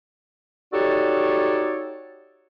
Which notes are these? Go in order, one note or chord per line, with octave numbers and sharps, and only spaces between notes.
D#4 F#4 G4 A4 C#5 D5